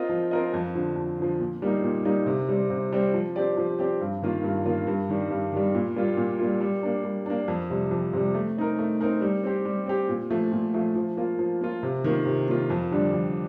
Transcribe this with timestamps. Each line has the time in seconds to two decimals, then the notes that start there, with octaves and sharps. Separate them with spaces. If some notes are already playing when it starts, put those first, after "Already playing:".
Already playing: C4 F4 A#4 D#5
0.09 F3
0.31 C4 F4 A#4 D#5
0.54 F2
0.75 D3 F3
0.96 F2
1.18 D3 F3
1.39 A#2
1.62 G3 A#3 D#4
1.83 A#2
2.05 G3 A#3 D#4
2.26 C3
2.49 G3 C4
2.70 C3
2.92 G3 C4
3.14 F3
3.36 C4 G4 D5
3.57 F3
3.79 C4 G4 D5
4.01 G2
4.22 D#3 A#3 F4
4.43 G2
4.65 D#3 A#3 F4
4.87 G2
5.09 D#3 G3
5.30 G2
5.52 D#3 G3
5.75 A#2
5.96 G3 A#3 F4
6.17 A#2
6.39 G3 A#3 F4
6.61 G3
6.83 A#3 D4
7.05 G3
7.26 A#3 D4
7.48 F2
7.70 C3 G3
7.91 F2
8.13 C3 G3
8.35 A3
8.57 C4 D#4 A#4
8.79 A3
9.01 C4 D#4 A#4
9.21 G3
9.44 C4 G4
9.65 G3
9.86 C4 G4
10.09 A#2
10.30 F3 A3
10.52 A#2
10.74 F3 A3
10.95 F3
11.17 A#3 F4
11.39 F3
11.61 A#3 F4
11.83 C3
12.04 D#3 A#3 F4
12.26 C3
12.48 D#3 A#3 F4
12.70 F2
12.91 D3 G3 D4
13.13 F2